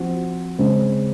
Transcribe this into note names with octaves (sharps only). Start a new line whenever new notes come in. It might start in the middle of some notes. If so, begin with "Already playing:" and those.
Already playing: F3 C4 F#4
C#3 G#3 C4